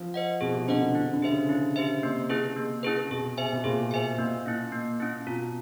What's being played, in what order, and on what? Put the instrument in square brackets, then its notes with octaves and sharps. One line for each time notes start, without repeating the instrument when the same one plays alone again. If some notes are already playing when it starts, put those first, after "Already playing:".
Already playing: [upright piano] F3
[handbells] C5 D#5 F#5
[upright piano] B2 [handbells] G#4
[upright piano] C3
[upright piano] D3 [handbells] C5 D#5 F#5
[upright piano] D3
[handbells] E4
[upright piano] D3
[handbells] G4 C5 E5
[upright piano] C#3
[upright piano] C#3 [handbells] E4
[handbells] G4 C5 E5
[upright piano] C3 [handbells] A#3
[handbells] C#4 E4 G#4 B4
A#3
C#4 E4 G#4 B4
[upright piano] B2 [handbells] G#4
[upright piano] C3 [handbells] C5 E5 G#5
[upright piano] B2
[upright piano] A#2 [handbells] G#4
[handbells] C5 E5 G#5
[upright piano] A#2 [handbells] A#3
[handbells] C#4 E4
A#3
C#4 E4
[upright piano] B2 [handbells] F4